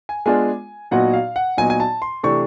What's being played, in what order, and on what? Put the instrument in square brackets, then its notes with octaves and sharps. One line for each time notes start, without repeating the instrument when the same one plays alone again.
[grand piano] G#5
[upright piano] G#3 B3 D4 F4 G#4 [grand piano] G#5
[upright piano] A#2 F#3 B3 D#4 F#4 [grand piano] F#5
[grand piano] F5
F#5
[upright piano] A#2 F#3 B3 D#4 F#4 [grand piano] G#5
[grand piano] G#5
A5
C6
[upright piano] C3 E3 A3 D4 [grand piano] C#6